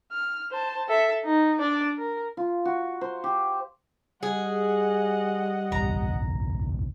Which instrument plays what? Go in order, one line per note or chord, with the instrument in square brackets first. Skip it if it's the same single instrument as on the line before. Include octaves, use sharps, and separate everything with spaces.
[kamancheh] F6
C5 A5
A4 E5
D#4
D4 D5
A#4
[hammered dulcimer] F4
F#4
C5
G4
[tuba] G3 [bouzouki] G#4 [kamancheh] D#5 F#5
[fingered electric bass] F#1 B1 E2 [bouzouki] A#5